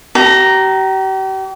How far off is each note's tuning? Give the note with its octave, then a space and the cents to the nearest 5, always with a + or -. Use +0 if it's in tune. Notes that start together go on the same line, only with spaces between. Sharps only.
G4 -40 A#5 +0